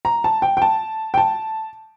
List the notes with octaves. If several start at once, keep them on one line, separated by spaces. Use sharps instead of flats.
A#5
A5
G5
G5
A5
G5
A5